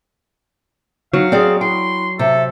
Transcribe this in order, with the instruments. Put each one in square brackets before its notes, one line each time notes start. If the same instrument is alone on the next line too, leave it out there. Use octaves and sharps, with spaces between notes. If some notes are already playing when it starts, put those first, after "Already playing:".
[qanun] F#3 [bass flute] D#4 [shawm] F5
[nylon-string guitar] C4 D5 [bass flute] G#4
[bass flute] E4 [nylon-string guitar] G5 [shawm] C6
[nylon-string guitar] C3 [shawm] A4 [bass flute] E5